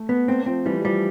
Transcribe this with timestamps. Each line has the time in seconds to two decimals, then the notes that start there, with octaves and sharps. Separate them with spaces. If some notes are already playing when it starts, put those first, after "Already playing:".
Already playing: A3
0.09 B3
0.28 A3 C4
0.46 F3 C4
0.65 E3 G3
0.84 F3 G3